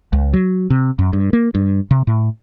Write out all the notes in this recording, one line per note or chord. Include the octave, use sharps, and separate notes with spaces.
C#2
F#3
C3
F#2
G2
A#3
G2
C3
A2